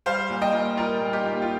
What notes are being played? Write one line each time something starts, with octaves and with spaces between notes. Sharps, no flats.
G3 C5 F5
A#2
D#5 G5
A#2
G3 F4 A#4
A#2
D#4 G4
A#2
F4